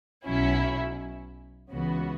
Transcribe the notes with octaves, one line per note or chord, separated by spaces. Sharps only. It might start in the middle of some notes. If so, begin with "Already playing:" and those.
B1 B2 F#3 C#4 E4
C#2 C#3 E3 B3 F#4